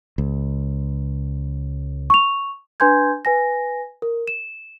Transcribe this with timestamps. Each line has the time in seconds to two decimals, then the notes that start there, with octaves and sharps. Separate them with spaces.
0.18 C#2
2.10 C#6 F7
2.80 D4 B4 G#5 C6 G6 G#6
3.25 B4 G#5 A#6
4.02 A#4
4.28 E7